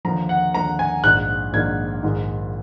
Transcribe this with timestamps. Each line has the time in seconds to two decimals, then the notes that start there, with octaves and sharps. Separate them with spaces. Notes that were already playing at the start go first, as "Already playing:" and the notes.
0.05 D#2 D3 F3 A#5
0.29 F#5
0.54 D#2 D3 F3 A#5
0.79 G#5
1.03 A#1 G#2 D#3 A#3 D4 F#6
1.53 A#1 G#2 D#3 A#3 D4 G#6
2.02 A#1 G#2 D#3 G#3